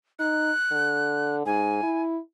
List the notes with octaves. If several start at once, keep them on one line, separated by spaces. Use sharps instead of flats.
D#4 F#6
D3
G#2 G#5
E4